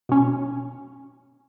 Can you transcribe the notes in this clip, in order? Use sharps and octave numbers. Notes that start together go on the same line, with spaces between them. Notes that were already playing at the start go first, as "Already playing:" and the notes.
B2 C#4